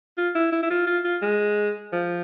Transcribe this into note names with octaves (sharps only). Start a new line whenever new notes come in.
F4
E4
E4
E4
F4
F4
F4
G#3
F3